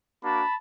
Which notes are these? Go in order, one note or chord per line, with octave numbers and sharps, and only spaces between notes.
A#3 D4 F#4 A5 B5